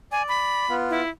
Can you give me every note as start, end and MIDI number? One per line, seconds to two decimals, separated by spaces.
0.12 0.65 74
0.12 0.23 80
0.28 0.74 83
0.69 1.01 59
0.69 1.01 65
0.90 1.09 64